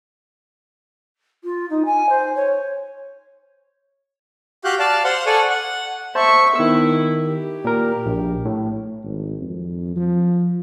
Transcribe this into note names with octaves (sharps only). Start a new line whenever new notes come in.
F4
D#4
G#5
C5
C#5
F#4 G4 F5 F#6 G6
D5 F5 A5
C5 F5 F#5 C6
A4 D5 F#5 G#5 C#6
F#5
C5 E5 A5 C#6
D#3 B3 E4 E6
G4
A#2 A#4
A#1
A2
G#1
F2
F3